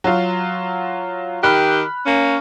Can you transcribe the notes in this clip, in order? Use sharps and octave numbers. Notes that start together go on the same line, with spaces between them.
F#3 F4
D#3 G4 B5 F6 F#6
A#3 C#4